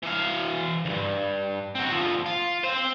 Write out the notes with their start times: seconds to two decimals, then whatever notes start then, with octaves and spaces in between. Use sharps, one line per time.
0.03 E3 F5
0.85 D2 G2
1.75 C4 F#4
1.92 D2 F3
2.26 F4
2.63 C4 C5